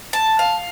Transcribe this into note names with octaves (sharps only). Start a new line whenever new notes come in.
A5
F5